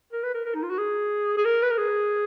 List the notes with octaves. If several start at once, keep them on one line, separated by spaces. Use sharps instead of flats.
A#4
B4
A#4
A#4
D#4
F4
F#4
G#4
G#4
A#4
B4
A#4
G#4